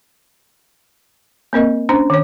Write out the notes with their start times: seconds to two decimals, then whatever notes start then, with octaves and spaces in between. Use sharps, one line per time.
1.53 A#3 C4 A#4 D#5
1.89 C#4 D4 C5 A#5
2.10 D#3 C#5